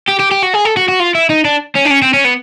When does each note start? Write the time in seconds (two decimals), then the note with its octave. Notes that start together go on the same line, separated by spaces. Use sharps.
0.09 G4
0.20 G4
0.32 G4
0.43 F#4
0.54 G#4
0.65 A4
0.77 F#4
0.88 F#4
1.00 F4
1.15 E4
1.30 D#4
1.45 D4
1.75 C#4
1.85 D4
1.90 C#4
2.02 C4
2.14 C#4
2.24 B3